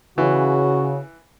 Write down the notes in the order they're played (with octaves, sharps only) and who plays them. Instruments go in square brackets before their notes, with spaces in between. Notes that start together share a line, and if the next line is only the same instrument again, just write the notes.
[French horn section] C#3 [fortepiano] E3 [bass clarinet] F#4